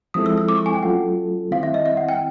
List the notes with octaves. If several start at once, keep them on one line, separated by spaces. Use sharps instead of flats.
F3 G#3 C4 E4 A4 D#6
E6
E6
D6
C#6
G#5
G5
F#3 A3 C#4 F4 A4 F#5
D#3 G3 C4 E4 F5
E5
D#5
E5
F#5
G5